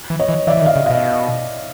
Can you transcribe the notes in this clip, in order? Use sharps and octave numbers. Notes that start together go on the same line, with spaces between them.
E3
C#5 D#5
E3
E3 D5 E5
E3
D#3
D#5 F5
C#3
B2 D#5 F5